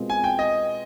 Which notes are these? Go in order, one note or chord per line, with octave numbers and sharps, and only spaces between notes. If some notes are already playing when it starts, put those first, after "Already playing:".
Already playing: B2 G#3 C4 F4 A#4
G#5
G5
D#5